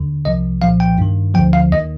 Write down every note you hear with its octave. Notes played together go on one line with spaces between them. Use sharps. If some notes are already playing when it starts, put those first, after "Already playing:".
Already playing: D#2 D3
C2 C3 F3 D#5
C2 A#2 F3 F5
G5
G2 D#3
D2 D3 F3 G5
F5
D#2 D#3 D#5